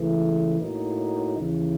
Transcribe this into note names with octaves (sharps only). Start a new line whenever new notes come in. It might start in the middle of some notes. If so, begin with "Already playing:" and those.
Already playing: C#2 C#3 E3 A3
A2 F#3 A#3 D#4
D#2 C#3 E3